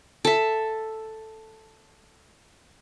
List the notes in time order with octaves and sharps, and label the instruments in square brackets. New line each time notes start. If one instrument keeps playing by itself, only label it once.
[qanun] A4 E5